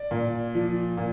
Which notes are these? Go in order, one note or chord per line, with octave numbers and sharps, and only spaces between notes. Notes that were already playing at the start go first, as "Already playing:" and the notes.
Already playing: D5
A#2
F3
A#2